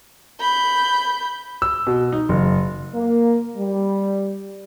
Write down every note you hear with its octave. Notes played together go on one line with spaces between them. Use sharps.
B5 G6
E6
B2
D#4
F#1
A#3
G3